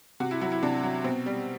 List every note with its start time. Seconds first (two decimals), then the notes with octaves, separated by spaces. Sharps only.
0.20 C3 F#4
0.31 E4
0.41 F#3 E4
0.52 E4
0.63 C3 D4
0.83 F#3
1.04 B2 C4
1.26 G3